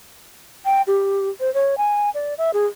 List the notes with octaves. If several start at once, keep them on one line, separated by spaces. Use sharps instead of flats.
G5
G4
C5
C#5
G#5
D5
E5
G#4